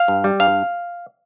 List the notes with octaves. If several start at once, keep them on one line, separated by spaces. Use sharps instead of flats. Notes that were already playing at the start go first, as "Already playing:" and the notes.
Already playing: F5
G2
G3
G2 F5